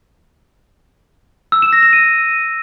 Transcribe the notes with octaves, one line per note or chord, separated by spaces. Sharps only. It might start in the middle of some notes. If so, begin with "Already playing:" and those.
E6
E7
A#6
E7
D#7